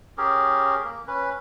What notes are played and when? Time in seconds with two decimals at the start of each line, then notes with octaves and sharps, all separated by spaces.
0.18 C#4 G4 G#4 A#4
0.84 A#3
1.07 C#4 B4